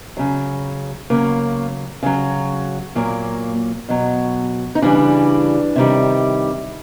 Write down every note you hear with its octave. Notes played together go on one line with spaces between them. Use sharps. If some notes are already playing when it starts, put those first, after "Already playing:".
C#3 F#3
C#3 F#3 A#3
C#3 F#3
A#2 F#3 A#3
B2 F#3
D#4
C#3 E3 G3 D4
C3 D#3 G3